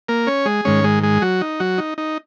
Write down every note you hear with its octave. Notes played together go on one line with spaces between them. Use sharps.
A#3 A#4
C#4 C#5
G#3 G#4
G#2 D#3 G#3 C#4 C#5
G#3 G#4
G#3 G#4
F#3 F#4
D#4
F#3 F#4
D#4
D#4